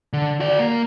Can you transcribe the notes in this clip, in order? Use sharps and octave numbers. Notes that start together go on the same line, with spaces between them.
D3
F#4 D5
A#3